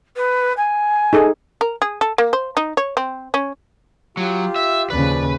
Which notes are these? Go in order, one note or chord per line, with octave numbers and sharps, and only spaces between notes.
B4
G#5
D#4 G#4 A4
A#4
G#4
A4
A#3
C5
D#4
C#5
C4
C#4
F#3 F4 G4
E5
D#2 C#3 F3 B4 D5